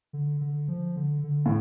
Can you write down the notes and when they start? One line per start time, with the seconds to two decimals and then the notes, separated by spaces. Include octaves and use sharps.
0.13 D3
0.41 D3
0.68 F3
0.96 D3
1.23 D3
1.46 A2